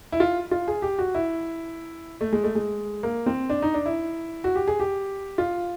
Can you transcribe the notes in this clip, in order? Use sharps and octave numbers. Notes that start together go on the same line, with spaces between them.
E4
F4
F4
G#4
G4
F#4
E4
A3
G#3
A3
G#3
A#3
C4
D4
D#4
D4
E4
F#4
G4
G#4
G4
F4